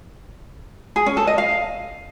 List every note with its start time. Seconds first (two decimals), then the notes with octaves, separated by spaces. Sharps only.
0.96 G#4
1.06 C#4
1.17 A4
1.27 D#5
1.38 F5